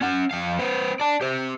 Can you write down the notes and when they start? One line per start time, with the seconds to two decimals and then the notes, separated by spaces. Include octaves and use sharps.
0.01 C#4 F#5
0.31 F2 F5
0.59 C4 B4
1.00 D5 A5
1.21 G4 C5